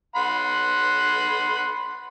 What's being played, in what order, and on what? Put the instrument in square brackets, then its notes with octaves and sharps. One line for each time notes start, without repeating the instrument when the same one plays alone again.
[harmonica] F#5 B5 C6